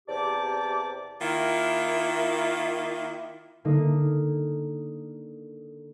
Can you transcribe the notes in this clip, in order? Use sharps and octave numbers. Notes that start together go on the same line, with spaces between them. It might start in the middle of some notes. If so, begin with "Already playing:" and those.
E2 C3 G4 D5 A5 D6
D#3 A#3 E4 F4
D3 A#3 D#4